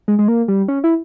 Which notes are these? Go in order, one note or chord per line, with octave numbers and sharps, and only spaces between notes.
G#3
G#3
A#3
G3
C#4
E4